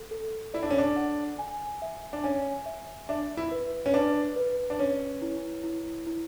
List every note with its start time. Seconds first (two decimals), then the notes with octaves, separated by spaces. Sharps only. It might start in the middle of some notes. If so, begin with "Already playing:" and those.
Already playing: A4
0.11 A4
0.54 E4 D5
0.63 D4
0.71 C#4
0.78 D4
0.96 F#5
1.39 G#5
1.82 E5
2.13 D4
2.23 C#4 G#5
2.66 E5
3.09 D4 E5
3.37 E4
3.51 B4
3.86 C#4
3.93 D4 B4
4.36 B4
4.70 D4
4.79 C#4 C#5
5.22 E4
5.63 E4
6.07 E4